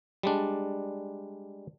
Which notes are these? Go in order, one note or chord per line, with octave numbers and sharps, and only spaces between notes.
G3 G#3 D4